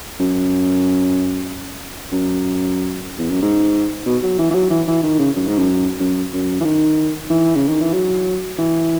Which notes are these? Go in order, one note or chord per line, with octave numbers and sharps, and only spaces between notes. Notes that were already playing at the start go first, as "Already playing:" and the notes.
F#2
F#2
E2
F#2
G#2
B2
F#3
E3
E3
F#3
E3
E3
D#3
C#3
F#2
G#2
F#2
F#2
F#2
E3
D#3
E3
C#3
D#3
E3
F#3
E3